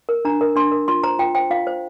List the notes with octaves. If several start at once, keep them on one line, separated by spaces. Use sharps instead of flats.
A#4
D4 A#5
A#4
D4 C6
A#4
F4 C6
C5 A#5
F4 G5
C5 G5
F4 F5
C5